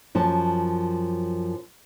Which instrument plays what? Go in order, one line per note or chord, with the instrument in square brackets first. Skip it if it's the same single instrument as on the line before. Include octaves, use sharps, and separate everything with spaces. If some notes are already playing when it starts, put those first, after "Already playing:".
[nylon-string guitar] F#2 F3 A5